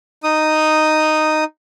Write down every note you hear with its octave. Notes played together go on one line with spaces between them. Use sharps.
D#4 D#6